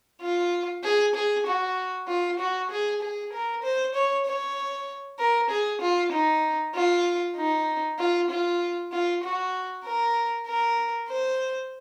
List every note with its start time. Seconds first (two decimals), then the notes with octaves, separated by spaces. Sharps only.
0.22 F4
0.84 G#4
1.15 G#4
1.47 F#4
2.08 F4
2.40 F#4
2.71 G#4
3.02 G#4
3.33 A#4
3.63 C5
3.95 C#5
4.26 C#5
5.19 A#4
5.50 G#4
5.82 F4
6.13 D#4
6.75 F4
7.37 D#4
7.99 F4
8.30 F4
8.92 F4
9.24 F#4
9.85 A#4
10.47 A#4
11.10 C5